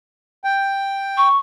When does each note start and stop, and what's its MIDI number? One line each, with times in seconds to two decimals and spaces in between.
0.44 1.28 79
1.17 1.38 85